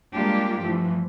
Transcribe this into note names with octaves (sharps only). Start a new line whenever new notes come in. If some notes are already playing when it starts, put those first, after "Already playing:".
G3 G#3 A#3 D4 F4 G4
G2 E3 F3 A3